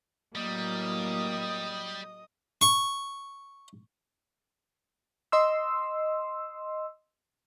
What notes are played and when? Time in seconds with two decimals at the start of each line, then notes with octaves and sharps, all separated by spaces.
0.36 A2 F#3 G3 A#3 D#5 D#6
2.61 C#6
5.32 D#5 C6 E6